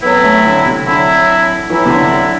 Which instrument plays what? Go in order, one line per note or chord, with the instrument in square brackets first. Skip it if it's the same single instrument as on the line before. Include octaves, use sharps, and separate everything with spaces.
[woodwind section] A2 F#3 C4 E4 [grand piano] B3
[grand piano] A3
D3
C3
[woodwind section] A2 F#3 C4 E4 [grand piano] D3
[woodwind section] A2 F#3 C4 E4 [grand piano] E3
[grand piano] C3
D3
D3